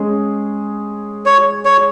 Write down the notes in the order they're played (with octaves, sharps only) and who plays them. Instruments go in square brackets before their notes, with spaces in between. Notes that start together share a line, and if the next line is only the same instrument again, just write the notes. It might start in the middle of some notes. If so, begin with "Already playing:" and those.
Already playing: [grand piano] G#3 C#4 G#4
[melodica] C#5
C#5